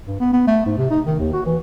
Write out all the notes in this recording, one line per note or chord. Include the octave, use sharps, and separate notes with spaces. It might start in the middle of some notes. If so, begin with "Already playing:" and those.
G2
B3
B3
A3
G#2
C3
D#4
D#3
D#2
F#4
E3